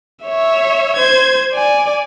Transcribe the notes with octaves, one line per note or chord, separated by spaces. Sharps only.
C#5 E5
C5 G#6
D5 G#5